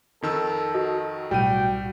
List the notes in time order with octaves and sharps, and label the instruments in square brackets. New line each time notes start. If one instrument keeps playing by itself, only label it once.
[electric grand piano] F2 D#3 E6 [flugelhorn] A4
[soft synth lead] F#4 [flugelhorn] A4 [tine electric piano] D#5
[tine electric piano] B1 A2 [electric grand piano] G3 D#7 [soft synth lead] F#4 [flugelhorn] G5